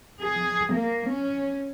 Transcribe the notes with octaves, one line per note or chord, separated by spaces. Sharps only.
G#4
A#3
C#4